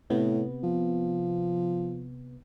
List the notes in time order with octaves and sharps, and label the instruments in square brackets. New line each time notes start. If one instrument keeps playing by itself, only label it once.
[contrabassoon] A2 [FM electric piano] C3 B3
[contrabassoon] F3